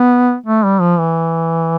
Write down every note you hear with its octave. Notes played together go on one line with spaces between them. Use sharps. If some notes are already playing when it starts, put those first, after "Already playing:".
Already playing: B3
A3
G3
F3
E3